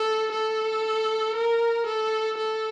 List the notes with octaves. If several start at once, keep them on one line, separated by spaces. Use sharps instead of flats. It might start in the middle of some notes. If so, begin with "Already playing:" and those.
Already playing: A4
A4
A#4
A4
A4